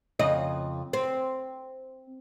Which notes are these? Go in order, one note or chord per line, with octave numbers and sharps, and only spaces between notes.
F2 C#3 D#5
C4